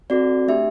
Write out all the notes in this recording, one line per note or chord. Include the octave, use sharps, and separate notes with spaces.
C4 F#4 A4 D5
A3 D4 G4 E5